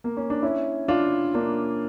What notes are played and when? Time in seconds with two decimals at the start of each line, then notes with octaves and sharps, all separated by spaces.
0.04 A#3
0.17 C#4
0.30 D4
0.43 C#4 E4
0.88 D4 F4
1.34 A#3 D4